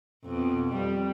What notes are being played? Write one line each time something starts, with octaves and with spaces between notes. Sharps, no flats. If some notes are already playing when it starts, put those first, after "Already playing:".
F2 B2
G3